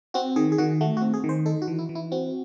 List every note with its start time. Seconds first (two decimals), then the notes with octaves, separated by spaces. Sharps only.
0.14 C4 F#4
0.36 D#3 G#4
0.52 G#4
0.58 D#3 F#4
0.81 A3 F#4
0.97 F#4
1.02 C4
1.14 G#4
1.24 D#3
1.29 C5
1.46 D#4 A4
1.62 F#4
1.68 E3
1.79 E4
1.89 E3
1.95 E4
2.12 C4 F#4